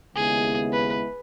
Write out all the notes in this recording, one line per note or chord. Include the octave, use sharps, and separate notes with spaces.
D#2 C#3 G#3 B3 E4 G#4
B4